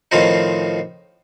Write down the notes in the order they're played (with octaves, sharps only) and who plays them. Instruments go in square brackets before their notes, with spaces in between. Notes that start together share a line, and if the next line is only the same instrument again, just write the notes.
[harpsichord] A2 D#3 F3 C4 D#4